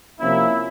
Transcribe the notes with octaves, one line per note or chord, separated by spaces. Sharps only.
C3 F3 A#3 C#4 E4